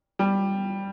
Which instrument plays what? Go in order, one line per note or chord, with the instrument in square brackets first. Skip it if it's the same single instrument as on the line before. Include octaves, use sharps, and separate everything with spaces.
[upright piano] G3